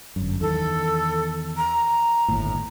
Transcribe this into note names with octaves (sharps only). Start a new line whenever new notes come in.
G1 F#2
E2 D#3 A4
A#5
G1 D#2 A2